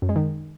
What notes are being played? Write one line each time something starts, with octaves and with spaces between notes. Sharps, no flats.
F#2
G#3
D#3